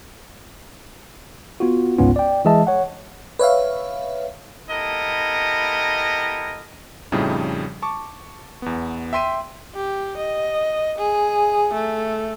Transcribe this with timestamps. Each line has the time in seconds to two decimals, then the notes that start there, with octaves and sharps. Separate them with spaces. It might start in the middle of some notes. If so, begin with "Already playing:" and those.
1.60 B3 F4 F#4
1.98 G1 C#2 G#2 B3 C#4 F4
2.16 D5 G5
2.45 E3 G#3 G#4 D#5 E5 A5
2.67 C#5 F#5
3.39 B4 C#5 E5 F5
4.70 B3 E4 G4 A4 A#4 D#5
7.12 F2 A2 C#3 F3 G3 D#4
7.82 A5 C#6 D6
8.62 E2 B3
9.13 E5 G5 C6 B6 D#7
9.74 G4
10.17 D#5
10.98 G#4
11.73 A3